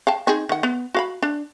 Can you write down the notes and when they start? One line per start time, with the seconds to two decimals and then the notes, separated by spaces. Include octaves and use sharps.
0.07 F5 G5 A5
0.27 C4 D#4 G#4
0.49 D#3 F#5
0.63 B3
0.95 F#4 F5 B5
1.23 D4